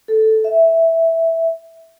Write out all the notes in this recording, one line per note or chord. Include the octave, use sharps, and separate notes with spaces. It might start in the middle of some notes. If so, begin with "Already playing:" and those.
A4
E5